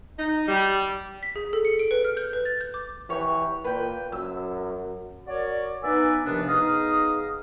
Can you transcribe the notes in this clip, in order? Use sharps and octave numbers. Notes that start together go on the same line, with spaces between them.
D#4
G3
B6
G#4
A4
C#7
D7
B4
F6
G6
B4
A6
G6
D6
E3 G4 C#5
A#2 B4 G5
F#2 E6
F#4 A#4 C#5 D5
B3 D#4 B4 D5 E5 G#5
D#2 C3 F3 B3 D4
B3 D#4 G#4 D#5 F5 D#6